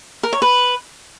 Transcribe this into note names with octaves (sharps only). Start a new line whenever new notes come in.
A#4
C#5
B4